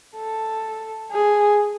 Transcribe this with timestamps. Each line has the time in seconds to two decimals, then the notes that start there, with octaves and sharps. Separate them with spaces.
0.17 A4
1.12 G#4